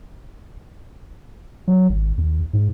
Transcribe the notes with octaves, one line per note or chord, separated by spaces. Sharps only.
F#3
G#1
D#2
G#2